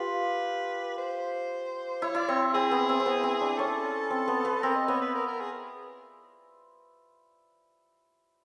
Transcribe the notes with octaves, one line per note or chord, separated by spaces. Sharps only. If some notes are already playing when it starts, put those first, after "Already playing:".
Already playing: F4 G4 B4
C5
E4 C#5
E4 D5
C4 C#5
C4 G#4
B3
C4
C4
B3
C4
D4
C#4 A4
C4
B3
B3
C4 A#4
D#5
B3 C#5
B4
A#4
A#4
G#4